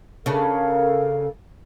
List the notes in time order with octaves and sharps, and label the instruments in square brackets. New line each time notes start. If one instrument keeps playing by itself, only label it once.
[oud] C#3 D4 [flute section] A4 A#4 F5